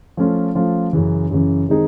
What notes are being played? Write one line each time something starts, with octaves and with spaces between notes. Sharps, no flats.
F3 A3 C#4 F4
F3 A3 C#4 F4
F#2 C#3 E3
F#2 C#3 E3
D#3 G#3 C4 D#4 G#4